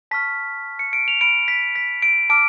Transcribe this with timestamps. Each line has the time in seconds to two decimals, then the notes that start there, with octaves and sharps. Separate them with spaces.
0.11 A5 C#6 F6 B6
0.79 C#7
0.93 D7
1.08 F7
1.21 B5 F6 D7
1.48 B6
1.76 B6
2.02 D7
2.30 A5 D6 F6 D7